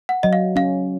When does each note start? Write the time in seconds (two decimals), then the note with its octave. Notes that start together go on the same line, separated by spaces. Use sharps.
0.09 F#5
0.23 F#3 D#5
0.33 F5
0.56 C#4 F5